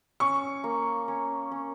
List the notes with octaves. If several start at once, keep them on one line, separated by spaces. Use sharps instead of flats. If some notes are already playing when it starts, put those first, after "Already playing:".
C#4 C#6
A#3
C#4
C#4